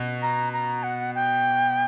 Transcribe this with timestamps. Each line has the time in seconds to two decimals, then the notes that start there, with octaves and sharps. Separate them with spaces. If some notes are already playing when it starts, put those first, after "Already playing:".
Already playing: B2
0.22 A#5
0.53 A#5
0.83 F#5
1.15 G5